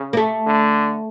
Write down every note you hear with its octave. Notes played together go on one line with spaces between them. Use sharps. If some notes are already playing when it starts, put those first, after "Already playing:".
Already playing: C#3
A#3
A3
D3